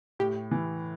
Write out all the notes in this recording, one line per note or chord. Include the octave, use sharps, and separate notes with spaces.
A2 G4
E3